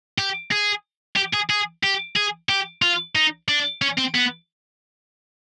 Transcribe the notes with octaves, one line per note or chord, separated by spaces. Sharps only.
G4
G#4
G4
G#4
G#4
G4
G#4
G4
F4
D#4
D4
C#4
C4
B3